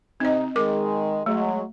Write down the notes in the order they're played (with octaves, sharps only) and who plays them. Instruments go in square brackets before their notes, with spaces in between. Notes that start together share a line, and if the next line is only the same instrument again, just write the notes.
[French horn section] C3 D#4 [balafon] C4 D#5
[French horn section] D#3 G#3 [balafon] A#4 D6
[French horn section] F#3 G#3 [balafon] A3